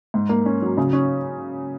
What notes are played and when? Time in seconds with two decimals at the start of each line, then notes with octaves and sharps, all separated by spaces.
0.14 G#2
0.29 A#3
0.46 C#4
0.62 F#3
0.77 C#3
0.93 C#4